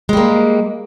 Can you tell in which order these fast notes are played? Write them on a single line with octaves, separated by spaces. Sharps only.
G#3 G3 A#3